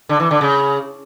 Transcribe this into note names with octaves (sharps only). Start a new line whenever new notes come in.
D3
E3
D3
C#3